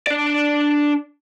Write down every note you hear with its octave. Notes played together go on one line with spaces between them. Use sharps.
D4 D5